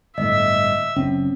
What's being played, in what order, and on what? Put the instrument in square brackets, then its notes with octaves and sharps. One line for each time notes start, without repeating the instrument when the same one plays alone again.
[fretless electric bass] G1 A2 [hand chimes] D#5 [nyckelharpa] E5
[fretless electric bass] F#1 C4 [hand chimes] C#4